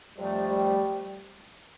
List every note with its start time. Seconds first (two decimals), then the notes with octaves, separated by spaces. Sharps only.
0.17 F2 C3 F3 G3 A3 D4
0.48 G3